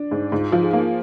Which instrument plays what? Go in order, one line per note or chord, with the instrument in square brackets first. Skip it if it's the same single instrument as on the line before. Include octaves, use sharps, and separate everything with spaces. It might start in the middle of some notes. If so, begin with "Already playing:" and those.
Already playing: [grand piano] D4
[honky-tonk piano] G#2
[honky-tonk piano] G#2 [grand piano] F4
[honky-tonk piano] F3
[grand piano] G#4
[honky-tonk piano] A#3